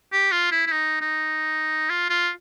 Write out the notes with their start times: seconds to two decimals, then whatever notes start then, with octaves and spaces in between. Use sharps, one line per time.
0.12 G4
0.32 F4
0.51 E4
0.67 E4
0.72 D#4
1.01 D#4
1.90 F4
2.10 F4